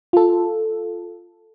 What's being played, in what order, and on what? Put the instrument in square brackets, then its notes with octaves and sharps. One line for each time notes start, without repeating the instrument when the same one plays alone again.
[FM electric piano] F4 A4